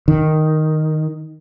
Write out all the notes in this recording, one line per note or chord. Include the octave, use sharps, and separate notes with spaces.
D#3